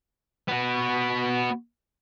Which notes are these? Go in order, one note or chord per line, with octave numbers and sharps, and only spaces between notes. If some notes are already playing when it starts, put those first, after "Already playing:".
B3 F#4